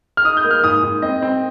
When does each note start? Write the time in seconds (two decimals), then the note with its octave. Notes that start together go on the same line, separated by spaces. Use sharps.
0.17 F6
0.24 D#4 D#6
0.37 G6
0.44 A#3
0.51 F6
0.63 G#2 D#6
0.83 G#2
1.02 C4 D#5
1.22 C4